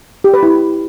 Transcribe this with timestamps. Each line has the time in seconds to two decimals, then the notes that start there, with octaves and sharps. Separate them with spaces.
0.24 G4
0.34 B4
0.43 E4